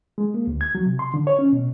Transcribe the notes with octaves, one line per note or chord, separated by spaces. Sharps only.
G#3
A#3
D2
G#6
F#3
C3
C6
D3
C#5
C#4
B2